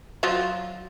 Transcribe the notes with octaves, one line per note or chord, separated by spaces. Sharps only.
F3 F#3 F4